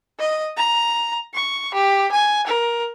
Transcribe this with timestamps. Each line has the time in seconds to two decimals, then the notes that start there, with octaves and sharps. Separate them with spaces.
0.19 D#5
0.57 A#5
1.34 C#6
1.74 G4
2.11 G#5
2.47 A#4